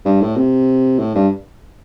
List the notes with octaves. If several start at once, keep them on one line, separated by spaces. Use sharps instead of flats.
G2
A2
C3
A2
G2